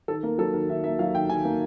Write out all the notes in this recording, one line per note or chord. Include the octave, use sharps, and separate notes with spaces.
D#3 A4
A#3 A#4
F#3 A4
D#3 A#4
D#3 E5
A#3 E5
F#3 F5
D#3 G5
D#3 G#5
A#3